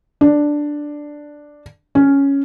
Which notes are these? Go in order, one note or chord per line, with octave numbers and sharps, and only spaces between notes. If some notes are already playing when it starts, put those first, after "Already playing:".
D4
C#4